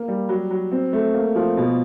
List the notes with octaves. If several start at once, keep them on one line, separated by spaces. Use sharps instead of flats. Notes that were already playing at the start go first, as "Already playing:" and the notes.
Already playing: A#3
G3
F#3
F#3
C4
A3
A#3
F3
B2